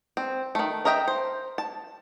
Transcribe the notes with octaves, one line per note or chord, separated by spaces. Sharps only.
C4
D#3 A3
A#4 D#5 E5 G5 A#5
C5
A5